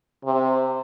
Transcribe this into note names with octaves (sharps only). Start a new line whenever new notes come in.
C3